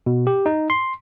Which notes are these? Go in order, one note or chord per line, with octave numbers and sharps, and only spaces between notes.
B2
G4
D#4
C6